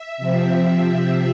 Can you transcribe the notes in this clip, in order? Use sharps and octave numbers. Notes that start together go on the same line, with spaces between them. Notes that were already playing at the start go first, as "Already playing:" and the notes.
Already playing: E5
C3 F3 C4